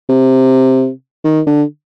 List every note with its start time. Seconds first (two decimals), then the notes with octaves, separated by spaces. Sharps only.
0.09 C3
1.24 D#3
1.46 D3